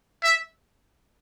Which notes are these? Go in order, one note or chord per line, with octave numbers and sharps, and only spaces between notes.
E5